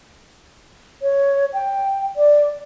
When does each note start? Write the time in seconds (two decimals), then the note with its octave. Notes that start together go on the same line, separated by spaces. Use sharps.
1.02 C#5
1.53 G5
2.16 D5